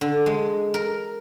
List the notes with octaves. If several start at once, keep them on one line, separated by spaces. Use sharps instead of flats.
D3
G#3
A#4